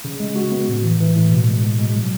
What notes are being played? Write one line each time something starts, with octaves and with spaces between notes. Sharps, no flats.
C#3
G#3
F#4
B3
A2
E3
E3
A2
B2
G#3
B2
G#3
F#3